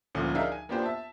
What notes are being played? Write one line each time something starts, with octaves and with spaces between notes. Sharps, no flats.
D2 A#2 F3 A3 C#4
D4 D#4 G#4 A#4 E5 F5
G#5
A#3 B3 D4 F4 G4 C5
E5 A5